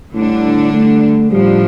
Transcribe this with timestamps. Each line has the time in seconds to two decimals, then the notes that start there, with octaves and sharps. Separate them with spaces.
0.15 A2 D3 G3 D4
0.74 A3
1.32 A2 F3 G3 D4